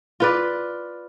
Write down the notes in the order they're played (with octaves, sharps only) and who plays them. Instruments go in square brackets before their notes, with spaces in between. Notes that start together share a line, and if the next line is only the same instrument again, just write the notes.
[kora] F4 B4 D5